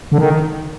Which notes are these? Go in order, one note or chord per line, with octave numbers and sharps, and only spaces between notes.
D3
D#3